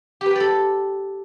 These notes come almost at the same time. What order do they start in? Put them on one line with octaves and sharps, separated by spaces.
G4 B4 G5 D5 A4